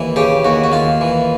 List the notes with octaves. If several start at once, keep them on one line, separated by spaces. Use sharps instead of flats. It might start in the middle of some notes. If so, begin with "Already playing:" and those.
Already playing: D#2 E3
C#3 G4
D#2 F#4
F#4
D#2 F4
E3